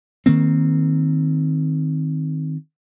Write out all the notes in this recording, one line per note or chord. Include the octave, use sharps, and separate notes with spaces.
D#3 A#3 C4